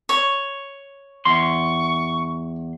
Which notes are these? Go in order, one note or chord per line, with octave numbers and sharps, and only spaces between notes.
C#5
E2 C6 C#6